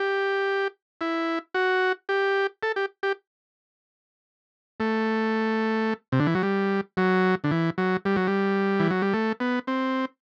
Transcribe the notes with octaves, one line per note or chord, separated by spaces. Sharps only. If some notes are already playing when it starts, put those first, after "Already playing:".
Already playing: G4
E4
F#4
G4
A4
G4
G4
A3
C3
D3
E3
F#3
G3
F#3
D3
E3
F#3
G3
F#3
G3
E3
F#3
G3
A3
B3
C4